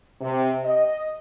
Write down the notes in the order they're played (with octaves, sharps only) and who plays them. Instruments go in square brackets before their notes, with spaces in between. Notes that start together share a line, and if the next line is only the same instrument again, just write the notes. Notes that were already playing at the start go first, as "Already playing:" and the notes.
[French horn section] C3
D#5